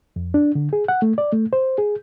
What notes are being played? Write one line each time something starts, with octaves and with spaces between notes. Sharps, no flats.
F2
D4
D3
G#4
F#5
A3
D5
A3
C5
G#4